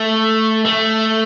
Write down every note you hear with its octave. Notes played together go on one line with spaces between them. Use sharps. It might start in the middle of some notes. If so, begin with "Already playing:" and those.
Already playing: A3
A3